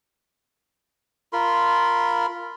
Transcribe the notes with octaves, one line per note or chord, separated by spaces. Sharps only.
F4 A#4 B5 C6